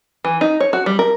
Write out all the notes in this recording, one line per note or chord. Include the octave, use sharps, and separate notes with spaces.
E3
D#4
C#5
F#4
G3
A#4